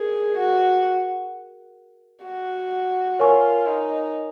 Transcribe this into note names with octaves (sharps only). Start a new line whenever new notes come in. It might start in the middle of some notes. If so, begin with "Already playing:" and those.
Already playing: G#4 A#4
F#4
F#4
F4 A#4 C#5 G#5 C#6
D#4